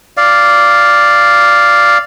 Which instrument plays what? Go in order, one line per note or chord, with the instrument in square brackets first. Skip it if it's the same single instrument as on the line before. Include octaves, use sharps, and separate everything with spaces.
[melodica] D5 F5